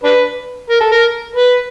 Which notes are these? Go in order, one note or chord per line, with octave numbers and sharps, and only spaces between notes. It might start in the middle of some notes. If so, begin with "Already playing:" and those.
D4 B4
A#4
A4
A#4
B4